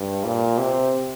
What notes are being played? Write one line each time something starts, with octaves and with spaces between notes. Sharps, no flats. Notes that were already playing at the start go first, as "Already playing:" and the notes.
Already playing: G2
A#2
C3